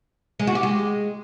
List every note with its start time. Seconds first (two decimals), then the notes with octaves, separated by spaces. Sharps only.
0.40 G#3
0.47 F#4
0.55 G4
0.63 G#3